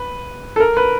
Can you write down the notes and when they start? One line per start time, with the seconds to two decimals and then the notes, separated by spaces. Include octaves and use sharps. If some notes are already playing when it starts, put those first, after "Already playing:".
Already playing: B4
0.56 A4
0.60 A#4
0.77 B4